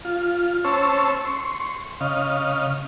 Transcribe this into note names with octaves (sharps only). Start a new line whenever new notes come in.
F4
C#4 C5 C#5 A5 E6
C6 C#6
C#3 D#5 F5